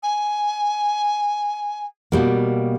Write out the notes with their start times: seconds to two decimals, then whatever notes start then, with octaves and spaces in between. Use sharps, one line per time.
0.03 G#5
2.12 B2 G3 A#3